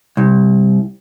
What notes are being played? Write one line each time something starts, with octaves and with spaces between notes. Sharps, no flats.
C2